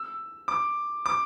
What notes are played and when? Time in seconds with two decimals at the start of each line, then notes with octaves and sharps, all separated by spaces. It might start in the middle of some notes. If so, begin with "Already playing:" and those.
Already playing: E6
0.48 D6
1.06 D6